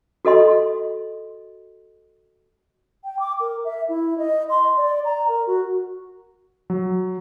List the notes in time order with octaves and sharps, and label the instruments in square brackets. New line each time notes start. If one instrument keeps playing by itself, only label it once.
[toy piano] F#4 A4 D#5 C6
[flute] G5
D6
A#4
E5
E4
D#5
C6
D5
A#5
A#4
F#4
[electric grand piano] F#3